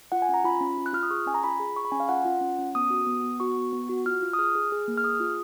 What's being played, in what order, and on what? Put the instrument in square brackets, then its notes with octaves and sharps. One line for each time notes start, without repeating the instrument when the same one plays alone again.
[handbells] F4 F#5
G#5
C#4
A#5
F4 B5
C#4
F4
F#6
F4 F6
D#6
G#4 C#6
C#4 G#5
A#5
F4 B5
G#4
G#4 C#6
B5
C#4 G#5
F5
F4 F#5
F4
C#4
C#4
B3 D#6
F#4
B3
B3
F#4 C#6
B3
B3
F#4
F4 F6
F4
D#6
G#4 F6
G#4
G#4
A#3
F6
G#4 D#6
F4